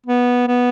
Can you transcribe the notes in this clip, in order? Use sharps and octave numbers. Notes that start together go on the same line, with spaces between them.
B3
B3